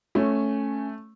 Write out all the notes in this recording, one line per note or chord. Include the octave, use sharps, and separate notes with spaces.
A3 C#4